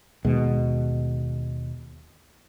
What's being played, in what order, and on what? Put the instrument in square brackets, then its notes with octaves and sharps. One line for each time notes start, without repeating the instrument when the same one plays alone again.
[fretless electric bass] D#2 B2 G#3